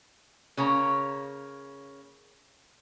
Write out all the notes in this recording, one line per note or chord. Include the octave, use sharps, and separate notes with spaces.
C#3 A#3 C#5 A#5